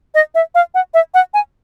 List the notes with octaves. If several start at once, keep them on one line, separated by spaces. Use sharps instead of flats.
D#5
E5
F5
F#5
E5
F#5
G#5